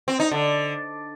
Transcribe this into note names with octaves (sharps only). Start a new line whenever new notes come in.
C4
D#4
D3